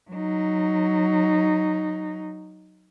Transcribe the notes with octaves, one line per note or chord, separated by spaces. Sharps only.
F#3 D#4